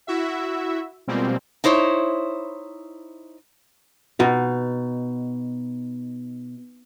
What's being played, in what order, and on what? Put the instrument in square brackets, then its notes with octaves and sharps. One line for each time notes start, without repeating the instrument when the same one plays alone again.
[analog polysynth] E4 F#4 E5
B2 F3 G3 G#3 A#3 C4
[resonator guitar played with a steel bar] D#4 E4 C5 C#5
[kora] B2 D#4